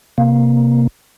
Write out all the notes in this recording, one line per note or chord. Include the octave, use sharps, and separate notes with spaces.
C3 A#3